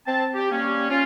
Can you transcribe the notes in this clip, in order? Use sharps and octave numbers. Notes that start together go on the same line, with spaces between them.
C4 A5
G4
G3 A#3 C#4
C#4 F4